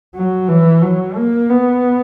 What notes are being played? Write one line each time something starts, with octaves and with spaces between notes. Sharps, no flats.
F#3
E3
F#3
A#3
B3